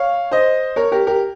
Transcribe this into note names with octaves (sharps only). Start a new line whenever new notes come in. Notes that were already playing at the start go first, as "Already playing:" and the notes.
Already playing: C#5 F5
C5 D#5
A#4 C#5
G4 A#4
G4 A#4